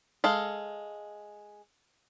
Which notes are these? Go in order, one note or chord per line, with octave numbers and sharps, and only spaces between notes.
G#3 A4 F5